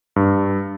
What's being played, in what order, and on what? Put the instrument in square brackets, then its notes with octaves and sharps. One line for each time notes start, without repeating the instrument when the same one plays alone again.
[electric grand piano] G2